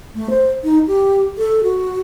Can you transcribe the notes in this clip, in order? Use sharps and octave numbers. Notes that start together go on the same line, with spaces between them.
A3
C5
D#4
G4
A4
F#4